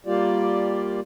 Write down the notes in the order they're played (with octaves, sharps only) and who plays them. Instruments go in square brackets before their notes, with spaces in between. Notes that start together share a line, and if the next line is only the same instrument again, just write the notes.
[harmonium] G3 A#3 F4 G4 D5